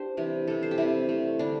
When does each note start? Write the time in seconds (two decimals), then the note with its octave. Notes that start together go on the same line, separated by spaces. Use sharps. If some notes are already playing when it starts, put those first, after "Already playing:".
Already playing: D4 G4 C5
0.17 C3 E3 G3
0.47 C3 G3 A4
0.63 C5
0.71 G4
0.78 C3 G3 E4
1.09 C3 A3
1.39 D3 G3 D4